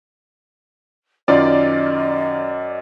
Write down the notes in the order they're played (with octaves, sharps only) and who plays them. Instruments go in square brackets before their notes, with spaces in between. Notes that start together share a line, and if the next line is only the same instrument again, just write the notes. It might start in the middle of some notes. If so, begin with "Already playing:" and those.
[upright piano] F#2 [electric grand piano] D#3 F4 [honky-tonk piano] D5 [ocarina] D#5